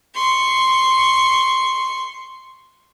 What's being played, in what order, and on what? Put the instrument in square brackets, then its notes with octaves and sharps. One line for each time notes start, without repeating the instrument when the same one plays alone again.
[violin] C6 C#6